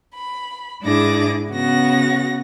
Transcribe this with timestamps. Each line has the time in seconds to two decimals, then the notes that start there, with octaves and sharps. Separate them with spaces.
0.16 B5
0.82 G#2 D4 E4 G#4 D6 A#6
1.50 C#3 B3 F#4 A#6